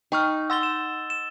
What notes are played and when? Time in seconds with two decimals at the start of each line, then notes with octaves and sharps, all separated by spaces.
0.12 D#4 G5 C#6 F6
0.50 F#5 C6 E6 A6 G7
0.63 E7
1.10 E7